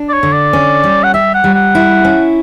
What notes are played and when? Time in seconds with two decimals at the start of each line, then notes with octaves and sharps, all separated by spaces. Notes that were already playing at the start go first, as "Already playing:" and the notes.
Already playing: D4
0.09 D5
0.13 C#5
0.23 D3
0.33 D5
0.53 C#4
0.84 G3
1.04 F#5
1.14 G4 E5
1.34 F#5
1.44 G3
1.54 F#5
1.75 E4
2.05 C#4